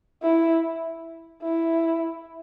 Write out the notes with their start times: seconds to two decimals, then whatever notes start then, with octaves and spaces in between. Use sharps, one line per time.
0.22 E4
1.42 E4